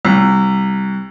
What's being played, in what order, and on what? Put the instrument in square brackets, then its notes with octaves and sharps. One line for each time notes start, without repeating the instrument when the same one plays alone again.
[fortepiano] C2